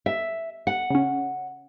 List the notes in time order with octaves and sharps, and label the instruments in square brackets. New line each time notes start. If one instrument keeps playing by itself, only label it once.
[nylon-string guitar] E5
F#5
[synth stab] C#3 C#4